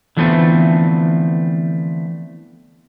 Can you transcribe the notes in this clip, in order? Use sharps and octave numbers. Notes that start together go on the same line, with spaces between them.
D3 E3 F3 A3 B3 C4